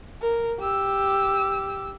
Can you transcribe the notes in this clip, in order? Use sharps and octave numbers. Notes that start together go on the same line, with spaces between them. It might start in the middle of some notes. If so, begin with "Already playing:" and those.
A#4
G4 E6